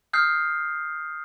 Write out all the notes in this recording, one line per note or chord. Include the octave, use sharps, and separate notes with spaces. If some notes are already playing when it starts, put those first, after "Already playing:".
D#6 F6 G6 C7